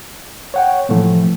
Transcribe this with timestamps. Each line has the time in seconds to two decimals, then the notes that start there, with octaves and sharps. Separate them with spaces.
0.54 C#5 F#5 G5
0.89 A2 C3 E3 F3 A3